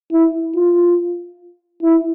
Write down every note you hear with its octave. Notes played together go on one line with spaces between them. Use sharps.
E4
F4
E4